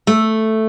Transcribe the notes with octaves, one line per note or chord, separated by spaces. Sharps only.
A3